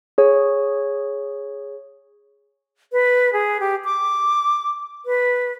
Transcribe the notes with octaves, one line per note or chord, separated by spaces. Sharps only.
G#4 C#5
B4
G#4
G4
D6
B4